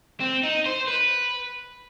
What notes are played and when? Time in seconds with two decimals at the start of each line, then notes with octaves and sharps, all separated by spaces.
0.20 C4
0.43 D#4
0.66 C5
0.88 B4